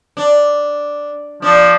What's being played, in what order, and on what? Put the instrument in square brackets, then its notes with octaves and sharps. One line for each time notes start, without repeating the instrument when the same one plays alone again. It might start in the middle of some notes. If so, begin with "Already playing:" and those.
[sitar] D4
[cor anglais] F3 [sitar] D4